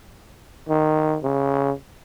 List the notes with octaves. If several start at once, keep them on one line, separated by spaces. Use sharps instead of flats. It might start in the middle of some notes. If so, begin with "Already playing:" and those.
D#3
C#3